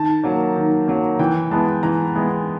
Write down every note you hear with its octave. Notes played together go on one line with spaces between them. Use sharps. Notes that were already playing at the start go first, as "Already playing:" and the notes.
Already playing: D#3 A5
F#3 A#3
D#3
F#3 A#3
E3 G5
G#3 B3 E4 A5
E3 A#5
G#3 B3 E4